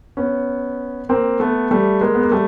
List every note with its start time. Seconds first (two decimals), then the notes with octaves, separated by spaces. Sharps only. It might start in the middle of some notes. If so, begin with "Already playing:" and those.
0.17 B3 C#4
1.09 A#3 C4
1.40 A3 B3
1.71 G3 A3
2.01 G#3 A#3
2.14 B3
2.23 A#3
2.32 G3 A3